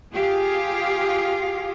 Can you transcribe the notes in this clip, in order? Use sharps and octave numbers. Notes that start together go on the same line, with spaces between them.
F4 G4 G#4 F5